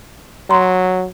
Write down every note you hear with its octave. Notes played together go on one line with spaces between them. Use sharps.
F#3 A#5 C6